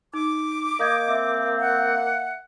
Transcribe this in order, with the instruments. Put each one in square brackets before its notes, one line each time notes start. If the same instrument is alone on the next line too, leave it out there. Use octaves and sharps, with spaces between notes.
[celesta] D#4 [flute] D6
[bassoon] A#3 [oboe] D#5 [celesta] F5 G6 G#6
[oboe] C4 [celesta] E5
[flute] F#5